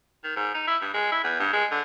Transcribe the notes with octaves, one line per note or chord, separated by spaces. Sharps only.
D#3
G#2
D#4
E4
G2
G#3
E4
E2
G2
G#3
D3